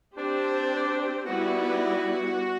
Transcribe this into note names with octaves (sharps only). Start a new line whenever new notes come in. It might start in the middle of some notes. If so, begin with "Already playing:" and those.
C4 D4 G4 C5
G3 B3 E4 F#4 B4 D5